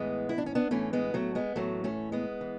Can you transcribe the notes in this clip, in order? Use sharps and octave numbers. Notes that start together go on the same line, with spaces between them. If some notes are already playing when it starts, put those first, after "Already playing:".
Already playing: A2 E3 G#3 B3
E4
D4
C#4
B3 D4
A2 E3 A3 C#4
G#3 B3
F#3 A3
G#3 B3
A2 E3 F#3 A3
A3 C#4
G#3 B3
E3